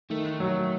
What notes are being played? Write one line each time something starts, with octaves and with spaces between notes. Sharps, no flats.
D#3 A3
F#3